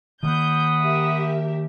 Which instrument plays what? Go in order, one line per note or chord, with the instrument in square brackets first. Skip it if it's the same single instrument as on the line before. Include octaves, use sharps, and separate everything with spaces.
[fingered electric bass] D#3 A#3 [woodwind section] F#5 B5 D#6 [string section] G6
[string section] G4 A#4 E5